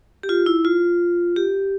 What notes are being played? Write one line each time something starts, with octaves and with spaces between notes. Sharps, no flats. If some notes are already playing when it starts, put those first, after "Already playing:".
G4
F4
E4
F4
G4